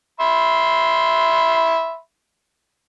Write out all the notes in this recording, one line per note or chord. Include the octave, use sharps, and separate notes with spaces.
E5 B5 C6